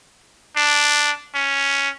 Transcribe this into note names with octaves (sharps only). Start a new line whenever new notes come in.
D4
C#4